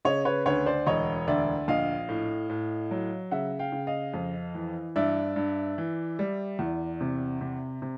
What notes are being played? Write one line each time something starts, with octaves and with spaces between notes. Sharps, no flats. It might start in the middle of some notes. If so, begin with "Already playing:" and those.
C#3 C#5 D#5
B4 C#5
D2 B4 C#5
C5 D5
E1 C#5 D#5
D2 D5 E5
A#1 D#5 F5
A2
A2
F#3
C#3 E5 F#5
F5 G5
C#3
D#5 F5
F2
E3
G2 D5 E5
G2
E3
G3
E2
C3
C3
C3